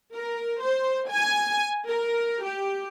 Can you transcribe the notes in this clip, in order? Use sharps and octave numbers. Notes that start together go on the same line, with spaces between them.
A#4
C5
G#5
A#4
G4